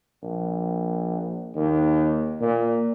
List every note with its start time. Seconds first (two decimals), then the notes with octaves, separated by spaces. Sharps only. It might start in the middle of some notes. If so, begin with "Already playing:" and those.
0.23 A#1
1.55 D#2
2.41 A#2